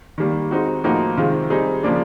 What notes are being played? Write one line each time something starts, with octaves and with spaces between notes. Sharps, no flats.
D#3 G3 A#3
G#3 C4 D#4 F#4
A2 F3 A#3 D#4 F#4
C3 D#3 G#3 C4 F4
G3 C4 D#4 G#4
C#3 F3 A#3 D4